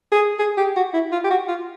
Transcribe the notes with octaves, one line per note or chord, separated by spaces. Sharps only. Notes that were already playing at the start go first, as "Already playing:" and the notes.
G#4
G#4
G4
F#4
E4
F4
G4
F#4
F4